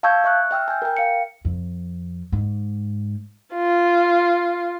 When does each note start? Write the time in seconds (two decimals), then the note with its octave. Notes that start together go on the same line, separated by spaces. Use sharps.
0.03 F5 A5 C#6 E6 G6 G#6
0.24 E5 C#6 F#6
0.51 E5 G5 E6 F6
0.68 G#5 G6
0.82 A#4 G5
0.97 F5 C#7
1.45 F2
2.32 G#2
3.54 F4